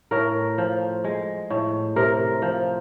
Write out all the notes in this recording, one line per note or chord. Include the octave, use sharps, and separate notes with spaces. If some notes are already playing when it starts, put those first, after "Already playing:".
A2 A#4
F3
G#3
A2
C3 A#4
F3